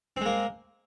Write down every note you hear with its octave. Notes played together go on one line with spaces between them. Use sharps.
G#3 A#3 C4